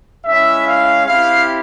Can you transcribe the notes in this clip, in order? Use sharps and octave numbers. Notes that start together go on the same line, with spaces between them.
G#3 C#4 E4 E5
F5
C4 E4 G4 F5